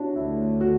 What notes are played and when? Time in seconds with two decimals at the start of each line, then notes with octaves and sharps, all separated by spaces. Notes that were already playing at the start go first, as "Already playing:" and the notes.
Already playing: D4 E4 F#4 C#5
0.15 D2 D3 A3 E4
0.61 F#4